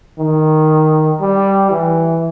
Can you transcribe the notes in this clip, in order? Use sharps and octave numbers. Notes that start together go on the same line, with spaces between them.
D#3
G3
E3